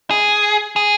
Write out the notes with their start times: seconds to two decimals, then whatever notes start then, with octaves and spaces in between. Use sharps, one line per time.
0.11 G#4
0.76 G#4